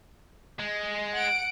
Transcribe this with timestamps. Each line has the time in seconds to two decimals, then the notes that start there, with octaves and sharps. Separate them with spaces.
0.60 G#3
1.15 F#5 D7